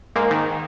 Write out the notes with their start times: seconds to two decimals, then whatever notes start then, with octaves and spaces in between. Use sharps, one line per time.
0.15 G#2 A#3
0.31 D#3